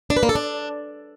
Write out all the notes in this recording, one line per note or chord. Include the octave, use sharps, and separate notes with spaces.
D4
B4
A#3
A4
D4